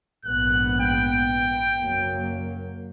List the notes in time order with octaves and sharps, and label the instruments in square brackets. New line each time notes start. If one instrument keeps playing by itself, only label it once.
[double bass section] A#1 G#2 B3 [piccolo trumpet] F#6
[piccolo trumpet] G5
[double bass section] F#1 F#3 A#3